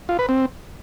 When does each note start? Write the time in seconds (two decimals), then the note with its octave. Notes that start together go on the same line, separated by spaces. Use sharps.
0.09 F4
0.19 B4
0.29 C4